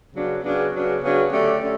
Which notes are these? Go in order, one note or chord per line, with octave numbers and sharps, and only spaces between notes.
C#3 F#3 B3 D4
C#3 F#3 B3 D4
C#3 F#3 B3 D4
C#3 F#3 B3 D4
D3 A3 C#4 G4
D3 A3 C#4